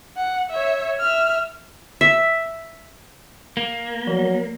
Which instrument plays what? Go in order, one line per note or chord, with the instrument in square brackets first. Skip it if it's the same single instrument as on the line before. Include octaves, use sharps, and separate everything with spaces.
[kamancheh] F#5
C#5 E5
E5 F6
[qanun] E5
[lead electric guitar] A#3
[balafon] F3 [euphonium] F#3